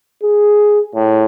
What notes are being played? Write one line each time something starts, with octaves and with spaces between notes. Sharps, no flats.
G#4
A2